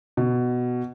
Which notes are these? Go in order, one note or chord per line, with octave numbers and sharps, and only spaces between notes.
B2